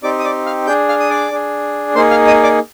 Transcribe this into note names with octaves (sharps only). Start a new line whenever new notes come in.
C4 D#4 G4 D5 D6
D#6
D5 D6
F5 F6
D4 G#4 G5 G6
F5 F6
D#6
D5 D6
D4 G#4
A#3 D#4 G#4 C5 C6
F5 F6
D#5 D#6
D5 D6